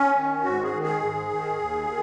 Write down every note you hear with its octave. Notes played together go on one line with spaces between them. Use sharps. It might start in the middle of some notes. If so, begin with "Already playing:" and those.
Already playing: C#4
D#3
G#2 F#4
G#4
D#3
G#4
G#2
D#3
D#2
D#3